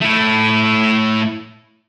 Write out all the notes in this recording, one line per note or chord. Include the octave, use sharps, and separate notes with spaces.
A3 E4